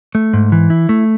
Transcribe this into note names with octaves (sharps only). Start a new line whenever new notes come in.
A3
G#2
E3
E4
A3